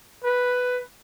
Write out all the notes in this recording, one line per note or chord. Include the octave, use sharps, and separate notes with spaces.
B4